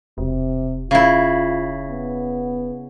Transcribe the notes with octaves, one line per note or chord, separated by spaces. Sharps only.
E1 C3
C#3 E4 F4
B3